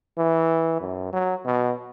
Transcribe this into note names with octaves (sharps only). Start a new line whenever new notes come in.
E3
F#2
F#3
B2